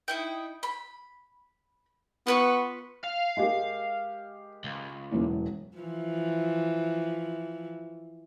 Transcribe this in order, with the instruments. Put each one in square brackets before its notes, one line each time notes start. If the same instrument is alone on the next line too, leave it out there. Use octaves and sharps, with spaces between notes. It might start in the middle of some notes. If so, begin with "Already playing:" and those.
[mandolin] D#4 E4 G5
B5
[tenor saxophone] B3 [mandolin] F4 B4 C#6
[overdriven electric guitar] F5
[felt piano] G#3 G4 A#4
[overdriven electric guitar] C#2
[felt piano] E1 F#2 E3
[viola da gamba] E3 F3